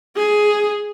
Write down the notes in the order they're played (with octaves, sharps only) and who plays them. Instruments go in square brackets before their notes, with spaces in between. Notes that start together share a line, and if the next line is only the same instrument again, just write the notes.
[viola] G#4